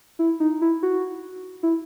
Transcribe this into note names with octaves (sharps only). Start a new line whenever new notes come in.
E4
D#4
E4
F#4
E4